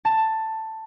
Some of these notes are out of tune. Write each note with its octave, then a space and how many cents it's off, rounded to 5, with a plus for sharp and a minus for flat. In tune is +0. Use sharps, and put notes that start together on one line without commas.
A5 +10